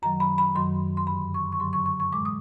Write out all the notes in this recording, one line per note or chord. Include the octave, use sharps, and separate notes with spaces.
F#2 D#3 F#3 A#5
B5
B5
F#2 D#3 F#3 C6
C6
G2 D3 F#3 B5
C#6
C#6
G2 D3 F#3 C6
C#6
C#6
C#6
A2 E3 G#3 D6
D#6